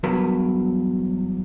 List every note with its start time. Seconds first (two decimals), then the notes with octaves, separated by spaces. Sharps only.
0.03 E2 G2 F#3 A#4 B4